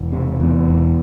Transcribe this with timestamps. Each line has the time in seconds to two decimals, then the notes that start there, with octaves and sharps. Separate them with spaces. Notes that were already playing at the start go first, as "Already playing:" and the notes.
Already playing: E1
0.12 C3
0.40 E2
0.68 E1